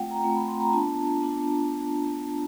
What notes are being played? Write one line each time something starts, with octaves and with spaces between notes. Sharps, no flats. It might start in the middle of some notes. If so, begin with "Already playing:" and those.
Already playing: A3 C4 F4 F#5 G5
A#5
A3 C4 F4
B5
C6
A#5
B3 D4 F4 A5
B3 D4 F4